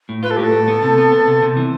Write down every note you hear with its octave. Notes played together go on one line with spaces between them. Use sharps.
A2
F4 B4
A4
A2 G4
A4
A2
B3
C3
B3
B3
C3
C3
E3